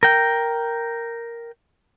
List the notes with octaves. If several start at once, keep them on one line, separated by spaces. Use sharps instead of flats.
A#4 G5